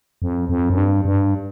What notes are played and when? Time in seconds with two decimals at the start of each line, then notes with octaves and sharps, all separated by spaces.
0.22 F2
0.49 F2
0.69 F#2
0.77 G2
1.05 G2